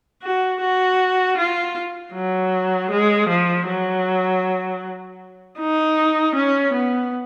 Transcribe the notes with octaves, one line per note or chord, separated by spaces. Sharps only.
F#4
F#4
F4
F#3
G#3
F3
F#3
D#4
C#4
B3